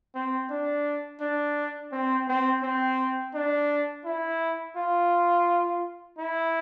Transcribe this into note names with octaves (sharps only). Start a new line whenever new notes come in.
C4
D4
D4
C4
C4
C4
D4
E4
F4
E4